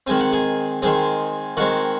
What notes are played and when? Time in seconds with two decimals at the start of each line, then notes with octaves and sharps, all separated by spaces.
0.07 D#3 G#3 C4 G#5
0.20 F#5
0.33 G#4 G#5
0.82 D#3 G#3 C4 G#4 G#5
1.57 D#3 G#3 C4 F#4 F#5